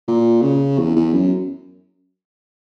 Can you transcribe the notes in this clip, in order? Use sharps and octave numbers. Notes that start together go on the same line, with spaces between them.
A#2
C#3
E2
E2
F#2